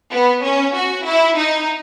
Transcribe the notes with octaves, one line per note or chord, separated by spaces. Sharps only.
B3
C#4
F#4
E4
D#4